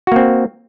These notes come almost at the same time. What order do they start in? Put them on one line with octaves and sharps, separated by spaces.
F#4 A#3 C4